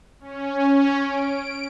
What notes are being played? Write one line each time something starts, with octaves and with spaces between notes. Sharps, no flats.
C#4
D7